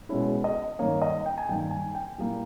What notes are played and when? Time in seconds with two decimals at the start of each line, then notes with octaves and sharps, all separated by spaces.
0.09 B2 G#3 C#4 E4
0.44 D#5
0.79 G2 D#3 A#3 C#5
1.02 D#5
1.26 G5
1.38 G#5
1.49 G2 D#3 A#3 G5
1.71 G#5
1.95 G5
2.18 A#2 G3 A#3 E4